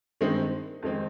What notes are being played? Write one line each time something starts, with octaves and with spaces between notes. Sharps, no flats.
G2 D#3 G#3 C4 D#4
F2 D#3 G#3 C4